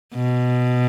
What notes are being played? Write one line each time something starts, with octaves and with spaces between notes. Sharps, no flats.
B2